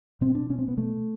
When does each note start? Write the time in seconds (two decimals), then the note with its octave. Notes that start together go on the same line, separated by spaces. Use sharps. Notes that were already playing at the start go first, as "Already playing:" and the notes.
0.21 B2 C4
0.35 D4
0.49 B2 C#4
0.59 C4
0.68 B3
0.77 B2 A3